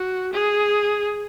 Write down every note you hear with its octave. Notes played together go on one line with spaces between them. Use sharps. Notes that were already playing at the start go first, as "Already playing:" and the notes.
Already playing: F#4
G#4